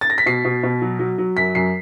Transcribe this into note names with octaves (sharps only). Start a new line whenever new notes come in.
A6
A#6
B6
B2 C7
B2
B2
F#3
F#3
F#3
F#2 B6
F#2 C7